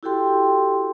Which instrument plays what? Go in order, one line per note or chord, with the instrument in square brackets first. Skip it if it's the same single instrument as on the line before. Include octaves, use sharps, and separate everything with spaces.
[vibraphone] E4 F#4 G4 A4 G5 C6